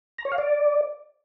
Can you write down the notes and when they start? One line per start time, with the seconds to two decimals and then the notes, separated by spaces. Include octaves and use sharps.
0.18 A#5
0.25 C#5
0.32 F5
0.38 D5